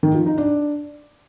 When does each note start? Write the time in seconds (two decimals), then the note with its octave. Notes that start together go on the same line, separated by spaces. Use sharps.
0.03 D#3
0.15 F3
0.26 D#4
0.38 D4